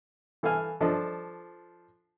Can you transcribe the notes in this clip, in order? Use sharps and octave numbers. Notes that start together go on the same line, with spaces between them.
E3 A4 F5 G#5 F6
F3 D4 A4 D#5